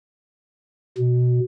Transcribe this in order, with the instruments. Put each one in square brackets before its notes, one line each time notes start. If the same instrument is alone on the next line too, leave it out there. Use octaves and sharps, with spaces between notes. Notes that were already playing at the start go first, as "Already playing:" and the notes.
[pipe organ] B2